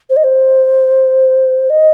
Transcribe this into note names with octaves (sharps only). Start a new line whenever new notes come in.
C5
D#5
C5
D#5